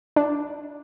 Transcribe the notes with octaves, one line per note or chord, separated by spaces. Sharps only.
D4